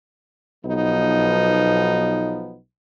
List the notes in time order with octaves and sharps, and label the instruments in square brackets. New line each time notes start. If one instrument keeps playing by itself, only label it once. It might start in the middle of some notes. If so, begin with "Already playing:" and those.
[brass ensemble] B1 F3 B3 D#4